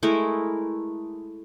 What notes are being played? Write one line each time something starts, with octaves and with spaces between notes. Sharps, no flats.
G#3 A3 E4 A#4